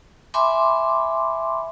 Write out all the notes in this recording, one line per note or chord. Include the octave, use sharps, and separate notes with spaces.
E5 G#5 B5 C6 D6